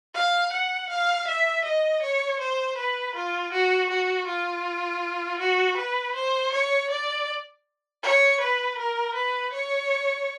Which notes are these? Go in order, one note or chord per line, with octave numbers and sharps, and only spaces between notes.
F5
F#5
F5
E5
D#5
C#5
C5
B4
F4
F#4
F#4
F4
F#4
B4
C5
C#5
D5
C#5
B4
A#4
B4
C#5